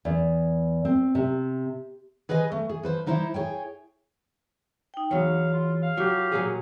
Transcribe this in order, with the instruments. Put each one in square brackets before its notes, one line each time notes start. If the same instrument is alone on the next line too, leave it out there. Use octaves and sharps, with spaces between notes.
[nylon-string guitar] E2
C4
C3
[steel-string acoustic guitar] G#4 B4 C5 D#5 G#5
A3
G#4
F3 B4 C5
G3 D#4 E4 C5 E5
G#4 C#5 G5
[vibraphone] D#4 G5
[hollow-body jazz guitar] E2 F#3 [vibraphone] C#5 [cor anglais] F5
[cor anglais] F4
F5
[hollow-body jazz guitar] F#3 [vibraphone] F4 [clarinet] G4
[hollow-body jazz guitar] A#2 F#3 G#4